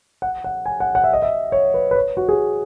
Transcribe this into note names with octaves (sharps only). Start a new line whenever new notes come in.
F#5
F#5
G#5
F#5
F#5
E5
D#5
E5
C#5
B4
B4
C#5
F#4
G#4